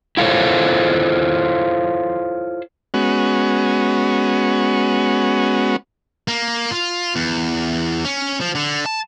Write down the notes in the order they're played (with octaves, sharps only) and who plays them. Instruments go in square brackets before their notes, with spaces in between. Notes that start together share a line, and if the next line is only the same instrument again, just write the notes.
[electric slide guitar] E4 F4 A4 C5 C#5
[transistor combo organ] G#3 B3 C#4 F#4
[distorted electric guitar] A#3
F4
E2
C#4
F3
D3
A5